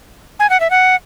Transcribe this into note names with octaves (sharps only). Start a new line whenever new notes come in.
G#5
F#5
E5
F#5